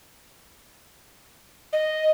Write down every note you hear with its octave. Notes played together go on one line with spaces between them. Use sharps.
D#5